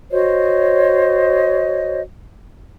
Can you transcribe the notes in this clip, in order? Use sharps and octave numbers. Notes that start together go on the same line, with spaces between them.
F#4 C5 C#5 D#5